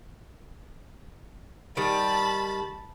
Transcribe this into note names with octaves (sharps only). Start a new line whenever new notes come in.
D#3 G3 A5 B5